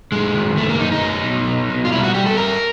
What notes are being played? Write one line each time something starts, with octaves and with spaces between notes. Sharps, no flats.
F#2 G#3
D#3
F#2 A3
A#3
F#2 D#4
D#4
F#3
B2
F#3
B2
F4
G3 E4
F#4
G3 G4
A4
G2 A#4